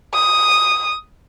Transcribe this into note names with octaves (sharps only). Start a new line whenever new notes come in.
D#6